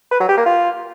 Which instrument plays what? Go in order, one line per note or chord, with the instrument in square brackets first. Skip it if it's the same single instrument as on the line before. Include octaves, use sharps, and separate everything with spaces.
[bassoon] B4
F#3
G4
A#3
F4